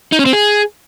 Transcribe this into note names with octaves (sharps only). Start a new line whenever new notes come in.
D#4
C#4
C4
G#4